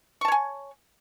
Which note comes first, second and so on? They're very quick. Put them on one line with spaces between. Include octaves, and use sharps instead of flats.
C#6 A5 C#5 G#5